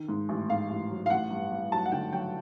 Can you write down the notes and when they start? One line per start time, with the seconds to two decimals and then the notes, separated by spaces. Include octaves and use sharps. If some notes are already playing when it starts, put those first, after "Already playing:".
Already playing: D#3
0.08 G#2
0.29 A1
0.49 G#2 F5
0.70 A1
0.91 F#3
1.06 F5
1.10 A1 F#5
1.31 G2
1.52 G2
1.72 F#3 A5
1.86 F#5
1.92 D3 G5
2.13 F#3 G5